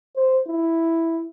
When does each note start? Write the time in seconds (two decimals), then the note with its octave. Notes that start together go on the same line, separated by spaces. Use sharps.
0.16 C5
0.48 E4